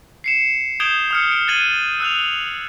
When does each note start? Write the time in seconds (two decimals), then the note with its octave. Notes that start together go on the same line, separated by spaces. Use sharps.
0.24 C7 C#7 E7
0.80 D#6 G6 G#6 D7 E7 G7
1.11 D#6 F6 C#7
1.31 D7
1.47 F#6 G#6 A6 D#7 F#7
2.00 E6 F#6 F7